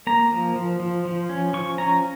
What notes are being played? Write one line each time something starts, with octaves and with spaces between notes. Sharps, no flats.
A#3 A#5
F3
F3
F3
F3
C#4
F3 C#6
C#4 A#5